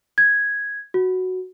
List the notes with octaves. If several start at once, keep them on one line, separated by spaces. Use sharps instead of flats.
G#6
F#4